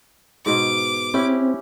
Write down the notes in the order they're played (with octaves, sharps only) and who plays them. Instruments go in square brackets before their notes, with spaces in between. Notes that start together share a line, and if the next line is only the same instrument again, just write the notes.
[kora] G#2 B2 [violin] D6
[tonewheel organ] C4 [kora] C#4 E4 G4